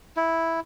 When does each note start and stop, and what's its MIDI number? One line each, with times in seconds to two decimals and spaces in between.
0.17 0.60 64